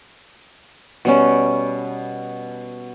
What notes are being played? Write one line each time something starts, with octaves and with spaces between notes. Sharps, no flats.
B2 G3 C#4